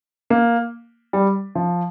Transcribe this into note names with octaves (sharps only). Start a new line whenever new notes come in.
A#3
G3
F3